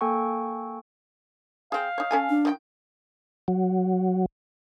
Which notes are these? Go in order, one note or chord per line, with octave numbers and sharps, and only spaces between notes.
A#3 A4 G5 G#5 C#6
C4 G#4 F5
D#4 C#5
C#4 A4 G#5
D4
D#3 C4 G5
F#3